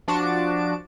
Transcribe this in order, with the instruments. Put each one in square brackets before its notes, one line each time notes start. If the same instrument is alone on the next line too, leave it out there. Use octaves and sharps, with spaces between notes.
[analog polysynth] F3 D4 F#4 A5 D7